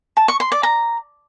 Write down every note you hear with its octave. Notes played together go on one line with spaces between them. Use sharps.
A5
C#6
C6
D5
A#5